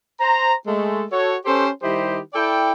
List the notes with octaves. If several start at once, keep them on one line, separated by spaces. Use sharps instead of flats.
C5 A#5
G#3 A3 A4
F#4 A4 C#5
C#4 G4 A4 C5
D#3 G3 E4 G4 C5 D#5
E4 A4 D5 G5